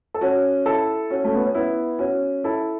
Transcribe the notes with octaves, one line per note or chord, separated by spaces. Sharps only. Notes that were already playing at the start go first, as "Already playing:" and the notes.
A4
C#4 F#4
E4 A4
C#4 F#4
A3
B3
C#4
B3 E4
C#4 F#4
E4 A4